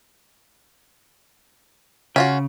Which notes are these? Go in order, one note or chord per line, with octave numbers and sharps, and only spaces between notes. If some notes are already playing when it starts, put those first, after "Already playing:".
C#3 C#4 F4 F#4